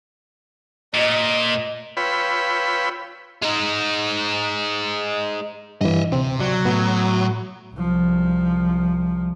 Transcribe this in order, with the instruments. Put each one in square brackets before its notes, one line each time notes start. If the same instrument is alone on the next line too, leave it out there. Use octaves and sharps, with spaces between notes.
[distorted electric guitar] A#2 [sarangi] D#5
[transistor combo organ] F4 B4 C#5 G5 B5 E6
[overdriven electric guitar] G#3 D#4
[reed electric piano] G2 E3 [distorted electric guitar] D#5 E5
[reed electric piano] D2 C4 [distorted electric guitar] C3
[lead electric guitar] F#3 [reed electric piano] D5
[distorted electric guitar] A2 [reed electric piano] B3 F#4
[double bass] C2 F3